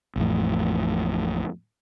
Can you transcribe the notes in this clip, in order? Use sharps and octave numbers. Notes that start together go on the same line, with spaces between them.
A1 F2 A2